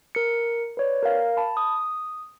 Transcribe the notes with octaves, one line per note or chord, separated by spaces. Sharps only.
A#4 C#7
B4 C#5 D5
A#4 F5
A5 B5
D#6